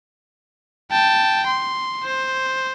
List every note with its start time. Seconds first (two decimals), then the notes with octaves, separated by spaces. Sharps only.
0.91 G5 A5
1.47 C6
2.03 C5